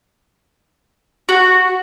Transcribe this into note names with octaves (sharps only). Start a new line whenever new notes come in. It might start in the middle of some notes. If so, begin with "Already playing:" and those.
F#4